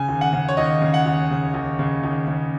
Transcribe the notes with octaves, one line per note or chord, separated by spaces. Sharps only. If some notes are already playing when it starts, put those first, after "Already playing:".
Already playing: C#3 G#5
D#2
F#5
C#3
C#5
D#2 D#5
C#3
F#5
D#2
C#3
D#2
C#3
D#2
C#3